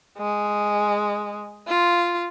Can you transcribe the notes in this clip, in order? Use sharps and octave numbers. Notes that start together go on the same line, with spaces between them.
G#3
F4